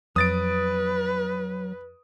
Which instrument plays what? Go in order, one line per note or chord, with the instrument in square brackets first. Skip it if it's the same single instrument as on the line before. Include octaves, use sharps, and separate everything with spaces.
[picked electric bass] F2 [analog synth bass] F#3 [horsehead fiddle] B4 [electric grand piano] D#6 A6 D7